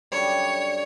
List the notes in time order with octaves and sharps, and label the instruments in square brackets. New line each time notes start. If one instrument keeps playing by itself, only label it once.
[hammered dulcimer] F#2 D3 G3 [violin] C#5